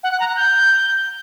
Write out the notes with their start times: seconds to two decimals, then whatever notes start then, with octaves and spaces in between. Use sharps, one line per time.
0.03 F#5
0.12 F#6
0.20 A#5
0.28 F#6
0.36 G6